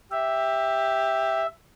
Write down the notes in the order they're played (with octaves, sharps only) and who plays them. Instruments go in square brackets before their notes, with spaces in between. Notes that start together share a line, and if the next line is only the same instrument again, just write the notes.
[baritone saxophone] G4 [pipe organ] E5